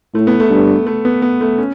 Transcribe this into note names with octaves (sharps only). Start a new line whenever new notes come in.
A2 A3
B3
A3
G2
A3
B3
B3
A3
C#4